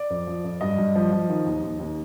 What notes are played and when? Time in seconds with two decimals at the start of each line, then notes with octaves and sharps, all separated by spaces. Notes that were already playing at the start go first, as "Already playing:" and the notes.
Already playing: D5
0.10 F2
0.27 F3
0.44 F2
0.61 G2 D#5
0.78 G2
0.95 F3
1.12 F3
1.29 D#3
1.46 D#2
1.63 D#2
1.80 D#2